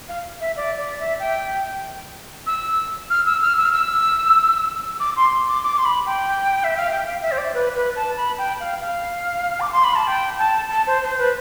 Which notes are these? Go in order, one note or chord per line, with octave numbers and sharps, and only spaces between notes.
F5
E5
D5
D5
E5
G5
E6
F6
E6
F6
E6
F6
E6
D6
C6
D6
D6
C6
B5
G5
E5
F5
G5
F5
E5
C5
D5
B4
B4
A5
B5
G5
F5
F5
D6
C6
B5
A5
G5
A5
A5
C5
C5
B4